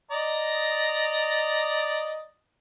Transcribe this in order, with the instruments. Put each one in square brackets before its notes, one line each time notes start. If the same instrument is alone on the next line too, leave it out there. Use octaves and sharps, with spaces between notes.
[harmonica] D5 D#5 A#5